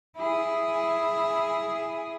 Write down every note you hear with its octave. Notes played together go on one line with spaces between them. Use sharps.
E4 G#4